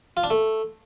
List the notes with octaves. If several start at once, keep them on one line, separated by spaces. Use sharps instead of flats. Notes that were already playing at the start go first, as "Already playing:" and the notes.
F4
D4
A3